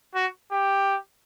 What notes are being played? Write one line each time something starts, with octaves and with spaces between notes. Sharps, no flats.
F#4
G4